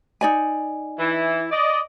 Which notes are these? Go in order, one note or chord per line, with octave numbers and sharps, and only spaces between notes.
D#4 D5 G#5
E3 E4
D5 D#5